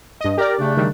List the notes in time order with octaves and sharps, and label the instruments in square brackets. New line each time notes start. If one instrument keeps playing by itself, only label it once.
[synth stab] G2 D#5
[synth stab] G4 D5 [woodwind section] A#4
[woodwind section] C#3 A3 D4
[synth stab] D#3 G3